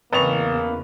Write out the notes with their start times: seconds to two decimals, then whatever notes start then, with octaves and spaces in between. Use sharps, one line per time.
0.13 G#1 E2 C#3 A#3 B4 C#6 F7